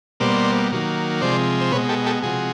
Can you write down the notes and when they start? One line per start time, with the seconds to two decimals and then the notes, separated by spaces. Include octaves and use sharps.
0.20 B2 G3 A#3 C5 D5
0.72 D#3 F#3 A#3
1.21 C3 F3 G#3 C5 D5
1.61 C5
1.72 B2 B4 C#5
1.76 G#3
1.89 G4 A4
2.06 G4 A4
2.23 C3 F3 G#3 F#4 G#4